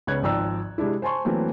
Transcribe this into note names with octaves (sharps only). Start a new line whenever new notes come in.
C#2 C#3 B3 C#5 F#6 G#6
G#1 F3 D5 G5 A#5 E6
C3 G#3 D4 E4
C5 G#5 A5 C6 C#6
E3 F#3 A3 A#3 C4